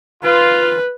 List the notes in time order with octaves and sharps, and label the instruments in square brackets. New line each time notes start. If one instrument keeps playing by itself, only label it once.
[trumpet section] F4 [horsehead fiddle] B4